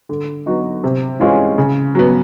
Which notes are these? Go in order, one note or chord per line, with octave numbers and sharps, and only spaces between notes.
D3
F#3 B3 D#4 F#4
C3
E3 G#3 C#4 F4
C#3
F#3 B3